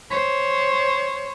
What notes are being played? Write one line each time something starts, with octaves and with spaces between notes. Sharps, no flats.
C5 C#5